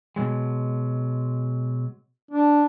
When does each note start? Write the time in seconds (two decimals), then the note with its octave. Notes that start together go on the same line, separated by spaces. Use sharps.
0.16 B2 F#3 G#3
2.31 D4